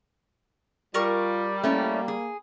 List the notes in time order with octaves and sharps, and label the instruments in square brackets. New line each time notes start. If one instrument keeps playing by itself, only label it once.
[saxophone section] G3 [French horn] F4 [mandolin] A#4 C#6
[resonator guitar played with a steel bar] A3 C#4 E4 [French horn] A#3
[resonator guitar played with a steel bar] G#4